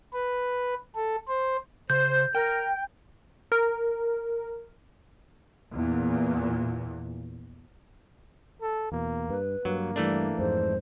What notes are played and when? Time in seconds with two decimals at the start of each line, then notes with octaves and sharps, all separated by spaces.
0.13 B4
0.95 A4
1.28 C5
1.90 C#3 C5 G6
2.35 A#4 G5
3.52 A#4
5.72 E2 A#2
8.62 A4
8.92 E2 B2 A#3
9.29 G2 B4
9.65 G2 F#3 A#3
9.96 E3 G3 A3 D4
10.38 F2 G#2 G#3 C5